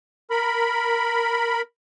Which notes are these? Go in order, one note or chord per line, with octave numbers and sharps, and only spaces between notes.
A#4 B5